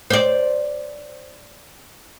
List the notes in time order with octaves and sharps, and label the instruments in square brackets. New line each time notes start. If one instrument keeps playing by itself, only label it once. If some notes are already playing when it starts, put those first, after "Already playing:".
[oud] C5 D5